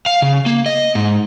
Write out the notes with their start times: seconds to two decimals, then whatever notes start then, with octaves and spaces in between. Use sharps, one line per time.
0.06 F5
0.22 C#3
0.46 A#3
0.66 D#5
0.95 G#2